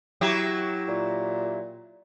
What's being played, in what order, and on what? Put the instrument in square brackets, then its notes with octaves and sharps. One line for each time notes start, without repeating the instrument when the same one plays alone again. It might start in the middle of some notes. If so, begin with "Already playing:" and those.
[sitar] F#3 E4 G4
[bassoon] A#2